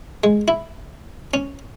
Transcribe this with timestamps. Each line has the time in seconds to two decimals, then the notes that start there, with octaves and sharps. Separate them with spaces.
0.24 G#3
0.48 E4
1.34 C#4